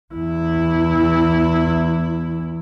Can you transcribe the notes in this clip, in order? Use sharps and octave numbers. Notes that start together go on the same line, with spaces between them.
E2 E4